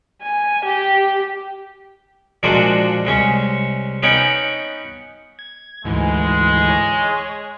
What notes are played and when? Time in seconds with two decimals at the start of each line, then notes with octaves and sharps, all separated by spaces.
0.22 G#5
0.65 G4
2.43 A#2 F3 G#3 A#3 D4 F#4
3.05 C2 G#3 C#4 C#6
4.03 B3 C#4 D#4 C#5 F#5 G5
5.39 G#6
5.84 D2 G#2 E3 G#3
6.70 C#5